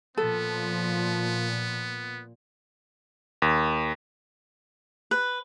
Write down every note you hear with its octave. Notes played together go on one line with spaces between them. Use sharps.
A#2 F3 B3 A4
D#2
B4